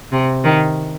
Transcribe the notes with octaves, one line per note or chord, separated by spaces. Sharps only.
C3
D#3